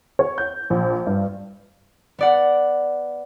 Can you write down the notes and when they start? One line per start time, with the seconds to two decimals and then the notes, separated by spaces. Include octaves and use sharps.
0.19 C#5
0.38 G6
0.70 A#1
1.07 G2
2.19 B3 D5 F#5